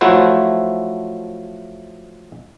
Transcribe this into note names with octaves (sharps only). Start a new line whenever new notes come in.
F3 F#3 A3 E4 F#4 C5